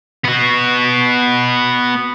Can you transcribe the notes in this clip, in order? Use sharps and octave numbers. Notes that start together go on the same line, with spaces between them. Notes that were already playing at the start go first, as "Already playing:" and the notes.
B3 F#4